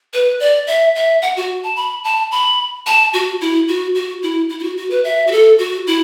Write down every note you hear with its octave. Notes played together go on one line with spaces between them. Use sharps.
B4
D5
E5
E5
F#5
F#4
A5
B5
A5
B5
A5
F#4
E4
F#4
F#4
E4
E4
E4
F#4
F#4
B4
E5
F#4
A4
F#4
E4